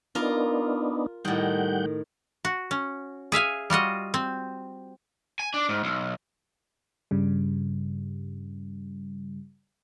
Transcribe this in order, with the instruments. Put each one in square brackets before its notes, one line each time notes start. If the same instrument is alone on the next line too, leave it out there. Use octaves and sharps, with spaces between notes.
[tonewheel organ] B3 D4 D#4 [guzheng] F4 A#4
[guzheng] A2 D#3 [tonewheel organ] G3 F#5 G6
[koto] F#4
C#4
G#4 E5 F5 G#5
G3 F4 F#4 D#5
C4
[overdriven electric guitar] G#5
D4
G#2
B1
[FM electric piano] G2 C#3 G3